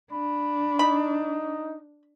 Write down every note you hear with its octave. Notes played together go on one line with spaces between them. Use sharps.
D4 B5
D#4 B5